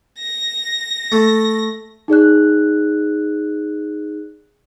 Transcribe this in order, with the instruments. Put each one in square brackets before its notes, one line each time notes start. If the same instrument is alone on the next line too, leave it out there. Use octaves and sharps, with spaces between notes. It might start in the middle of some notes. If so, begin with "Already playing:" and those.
[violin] A#6
[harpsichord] A3
[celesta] D#4 G#4 D5 F#6